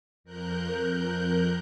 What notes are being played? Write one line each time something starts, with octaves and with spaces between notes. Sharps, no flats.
F2 A#4 F#6 G6